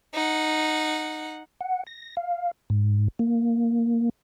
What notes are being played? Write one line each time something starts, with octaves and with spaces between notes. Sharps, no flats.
D#4 F#5
F#5
A#6
F5
G#2
A#3